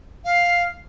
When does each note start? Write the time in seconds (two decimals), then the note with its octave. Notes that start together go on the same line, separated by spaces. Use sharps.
0.25 F5